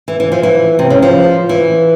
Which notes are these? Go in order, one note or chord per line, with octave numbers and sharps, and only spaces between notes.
E3
E3
F3
E3
C3
C#3
F3
E3